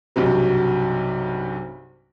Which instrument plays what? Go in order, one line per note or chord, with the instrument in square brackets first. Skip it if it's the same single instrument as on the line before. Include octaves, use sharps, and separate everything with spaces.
[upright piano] B1 G2 C3 F#3